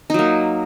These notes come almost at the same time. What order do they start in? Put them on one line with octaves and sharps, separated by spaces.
D#4 F#3 A#3